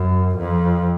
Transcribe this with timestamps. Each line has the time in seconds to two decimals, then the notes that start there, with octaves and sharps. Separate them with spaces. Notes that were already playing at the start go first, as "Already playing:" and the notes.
Already playing: F#2
0.38 F2